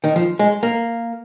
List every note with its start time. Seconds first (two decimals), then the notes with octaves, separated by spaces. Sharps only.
0.04 D#3
0.16 F3
0.39 G#3
0.63 A#3